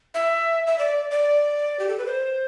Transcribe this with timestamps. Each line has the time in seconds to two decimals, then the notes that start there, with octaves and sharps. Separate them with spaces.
0.14 E5
0.67 E5
0.79 D5
1.11 D5
1.80 G4
1.89 A4
1.98 B4
2.06 C5